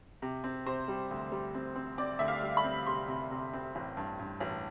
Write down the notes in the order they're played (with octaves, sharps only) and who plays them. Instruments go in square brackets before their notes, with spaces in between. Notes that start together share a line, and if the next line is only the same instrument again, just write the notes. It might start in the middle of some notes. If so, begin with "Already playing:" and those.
[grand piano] C3
C4
[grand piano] C3 [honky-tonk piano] C5
[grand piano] G3
D2
G3
C4
C4
[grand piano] C4 [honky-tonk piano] D5
[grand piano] D2 [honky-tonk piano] E5
[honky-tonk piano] F5
[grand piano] G3
[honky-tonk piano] B5
[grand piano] C4
[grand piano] C3 [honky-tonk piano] C6
[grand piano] C3
C3
C4
A1
G2
G2
A1